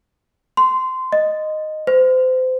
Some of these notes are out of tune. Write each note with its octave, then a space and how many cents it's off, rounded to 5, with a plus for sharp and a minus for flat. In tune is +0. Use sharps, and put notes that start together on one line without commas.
C6 -15
D#5 -5
C5 -30